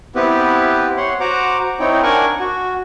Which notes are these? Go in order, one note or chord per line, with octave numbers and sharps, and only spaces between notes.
B3 C4 E4 G4 B4
C#5 F#5 C6
F#4 C5 F#5 A#5 D6
C4 D#4 E4 C#5 G5
D4 A#4 F#5 G#5 C#6
F#4